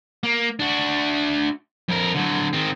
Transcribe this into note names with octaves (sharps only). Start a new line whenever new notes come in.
A#3
D4 F#4
F2 A#4
D3 F#3
D#3 C4